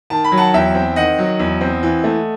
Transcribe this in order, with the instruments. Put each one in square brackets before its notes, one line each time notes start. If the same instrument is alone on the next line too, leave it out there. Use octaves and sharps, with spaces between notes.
[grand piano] D#3 A5
B5
F#3
F#5 A5
E2 E5 G5
C4
D#3 D#5 F#5
F#3
E2
C4
E3
A3